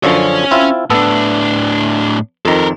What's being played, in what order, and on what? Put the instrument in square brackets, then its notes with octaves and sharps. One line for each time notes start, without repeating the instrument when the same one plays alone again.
[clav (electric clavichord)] F#2 D3 F3 [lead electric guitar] C#4 C#5
[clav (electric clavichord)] C4 E4 F4
[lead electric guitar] A2 D4 [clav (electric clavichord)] B3 A4
[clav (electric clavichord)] F2 D#3 [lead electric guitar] A4 A#4